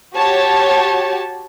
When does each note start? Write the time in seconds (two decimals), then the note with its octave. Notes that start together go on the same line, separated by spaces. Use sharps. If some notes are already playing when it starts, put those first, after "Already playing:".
0.15 F#4 G4 C#5 A5